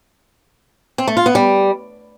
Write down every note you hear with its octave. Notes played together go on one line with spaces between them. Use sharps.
C4
A3
F4
B3
G3